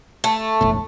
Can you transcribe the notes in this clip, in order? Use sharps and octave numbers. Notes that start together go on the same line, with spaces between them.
A3
E1 B1 A2